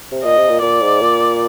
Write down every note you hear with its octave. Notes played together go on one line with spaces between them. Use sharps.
C3
A#2 D#5
C3
A#2
A#2 D5
G#2
A#2